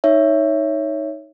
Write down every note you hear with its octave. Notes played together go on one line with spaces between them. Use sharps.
D#4 C#5 E5